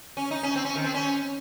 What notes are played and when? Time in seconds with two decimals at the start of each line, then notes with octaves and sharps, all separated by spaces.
0.17 C#4
0.31 D#4
0.43 C#4
0.56 C4
0.65 C#4
0.76 D#3
0.84 C4
0.94 C#4